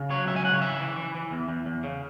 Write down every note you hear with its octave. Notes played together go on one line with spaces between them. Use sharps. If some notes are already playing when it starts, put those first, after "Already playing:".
Already playing: C#3
F#3 C#5
C#2 E5
G#5
C#3 F#5
C#5
E3 E5
E3
E3
E3
E2
E2
E2
C#3